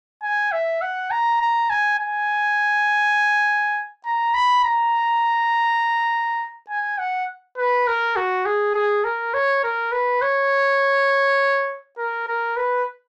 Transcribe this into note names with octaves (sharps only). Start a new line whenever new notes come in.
G#5
E5
F#5
A#5
A#5
G#5
G#5
A#5
B5
A#5
G#5
F#5
B4
A#4
F#4
G#4
G#4
A#4
C#5
A#4
B4
C#5
A#4
A#4
B4